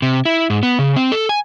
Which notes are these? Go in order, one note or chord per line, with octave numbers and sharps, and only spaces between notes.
C3
E4
G#2
B3
C#3
C4
A4
G#5